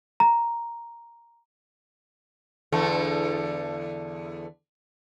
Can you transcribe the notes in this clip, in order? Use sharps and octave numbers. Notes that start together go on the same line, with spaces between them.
A#5
E2 D3 A3